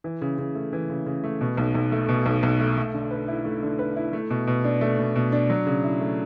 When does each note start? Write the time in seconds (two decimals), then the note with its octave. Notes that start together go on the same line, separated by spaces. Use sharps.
0.04 E3
0.22 C#3
0.38 C#3
0.55 A3
0.73 E3
0.89 C#3
1.06 C#3
1.24 A3
1.41 B2
1.57 B1
1.75 B1
1.92 A3
2.08 B2
2.26 B1
2.43 B1
2.60 A3
2.77 A3
2.94 D3
3.11 B4
3.28 E4
3.45 A3
3.63 D3
3.79 B4
3.96 E4
4.13 A3
4.30 B2
4.47 B2
4.64 D4
4.81 A3
4.99 B2
5.16 B2
5.32 D4
5.50 F#3
5.67 C#3
5.84 E4
6.00 A3